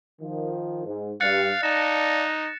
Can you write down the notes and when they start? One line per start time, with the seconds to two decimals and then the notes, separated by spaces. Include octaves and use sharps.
0.21 D#3 F3
0.85 G#2
1.21 G2 F5 F#6 A6 C#7
1.63 D#4 D5 F5 A5 A6 A#6 E7